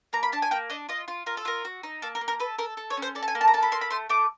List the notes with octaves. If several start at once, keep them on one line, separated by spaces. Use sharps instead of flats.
A#3 A#5
B5
D4 A5
G#5
A#3 G5
D4 D#5
F4 D#5
F4
F4 A#4
A4
F4 A#4
F#4
D#4
A#3 A4
A#4
A#3
A#4
A4 B4
A4 A#4
A4
C#5
C#4
C5
A4 D5
A5
G#5
A#3
A5
A#5
A4 A5
B5
A#3 C6
B5
A3 C6
A3 D6